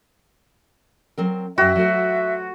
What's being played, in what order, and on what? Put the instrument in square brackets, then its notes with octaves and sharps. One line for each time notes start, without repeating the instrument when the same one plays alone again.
[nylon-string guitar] F#3 C4 A#4
[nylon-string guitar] F#2 G5 [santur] F#4 [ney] E5
[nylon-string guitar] F#3 A3 C5